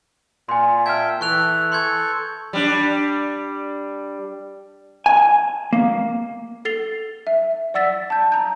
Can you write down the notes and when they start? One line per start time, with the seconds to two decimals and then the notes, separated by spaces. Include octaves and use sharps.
0.49 A#2 G#5 C6
0.86 E5 G5 A5 F6 G#6
1.21 E3 A4 C#6 F#6 F7
1.72 A4 C6 C#6 G6 G#6
2.53 G3 D4
5.06 G#5
5.73 A#3
6.65 A4 A6 C7 F7 G7
7.27 E5
7.74 D5 F#5 E6 A6 B6
8.10 A5 G6
8.32 A#5 G6